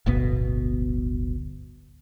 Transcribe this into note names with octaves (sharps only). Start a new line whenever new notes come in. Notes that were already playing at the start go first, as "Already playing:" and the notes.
D1 G1 B2 B3